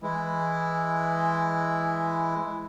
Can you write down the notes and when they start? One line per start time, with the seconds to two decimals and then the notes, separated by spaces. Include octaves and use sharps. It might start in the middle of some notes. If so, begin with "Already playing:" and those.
0.03 E3 G#3 E4